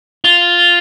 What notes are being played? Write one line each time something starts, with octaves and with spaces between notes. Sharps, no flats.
F4